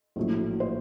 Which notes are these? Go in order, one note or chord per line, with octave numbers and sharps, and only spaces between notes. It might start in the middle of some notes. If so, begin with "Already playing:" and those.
A#1 A2 F#3
C5